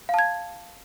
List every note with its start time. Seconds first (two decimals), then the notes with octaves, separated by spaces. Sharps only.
0.09 F5
0.14 A5
0.19 G#6